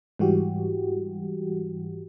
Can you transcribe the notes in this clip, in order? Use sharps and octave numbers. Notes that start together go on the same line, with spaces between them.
G#2 E3 G3 F#4 G4